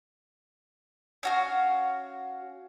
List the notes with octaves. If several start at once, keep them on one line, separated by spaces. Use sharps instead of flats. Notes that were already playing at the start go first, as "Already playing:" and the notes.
C#4 F#4 F5